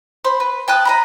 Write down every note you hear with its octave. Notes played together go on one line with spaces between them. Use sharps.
C5 B5
B4
G5 A5 D#6 F#6
D#5 A#5 B5